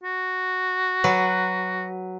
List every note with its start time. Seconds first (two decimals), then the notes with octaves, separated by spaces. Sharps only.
0.03 F#4
1.04 F#3 B4